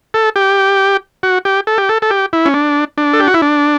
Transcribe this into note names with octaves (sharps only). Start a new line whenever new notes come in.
A4
G4
F#4
G4
A4
G4
A4
A4
G4
E4
C#4
D4
D4
A4
G4
F#4
E4
D4